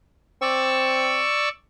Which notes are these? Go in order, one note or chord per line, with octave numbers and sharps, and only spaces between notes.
C4 D5 C#6 E6